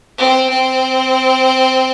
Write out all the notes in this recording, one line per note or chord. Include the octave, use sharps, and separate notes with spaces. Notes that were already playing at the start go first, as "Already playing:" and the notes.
C4
C4